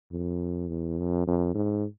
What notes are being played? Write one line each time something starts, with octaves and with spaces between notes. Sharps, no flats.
F2
E2
F2
F2
G#2